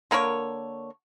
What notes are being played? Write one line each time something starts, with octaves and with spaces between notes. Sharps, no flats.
D3 A#3 A#4 C#5